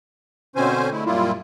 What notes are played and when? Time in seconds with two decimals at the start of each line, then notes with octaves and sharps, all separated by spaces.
0.56 B2 D3 C4 C#4 C5 G#5
0.92 D3 G#3 A3 E4
1.06 F#2 A#2 G3 A#3 E4 F4